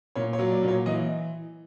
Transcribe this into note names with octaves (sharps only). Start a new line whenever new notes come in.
A#2 C#5
C#5
F#3
D5
A#2
C#5
E3 D#5